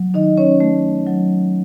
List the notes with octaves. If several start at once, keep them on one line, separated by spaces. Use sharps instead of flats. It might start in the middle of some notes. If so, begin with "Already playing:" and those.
Already playing: F#3
D#3 D#4 D#5
C#4 C#5
A3
F#3